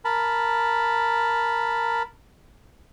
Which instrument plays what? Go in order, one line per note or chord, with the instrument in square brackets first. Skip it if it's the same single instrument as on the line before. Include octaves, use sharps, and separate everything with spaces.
[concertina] A#4 A5 B5